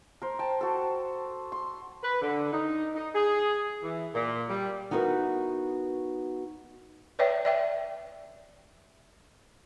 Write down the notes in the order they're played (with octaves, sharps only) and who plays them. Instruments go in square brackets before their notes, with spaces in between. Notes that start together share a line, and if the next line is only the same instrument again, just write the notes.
[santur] A#4 C5
G5 A5
F#4 A4
C6
[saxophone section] B4
D3
D#4
D#4
G#4
E3
A#2
G3
[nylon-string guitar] B3 D#4 E4 F#4 A#4 B4
[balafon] B4 C#5 D5 E5 G5
D5 E5 G5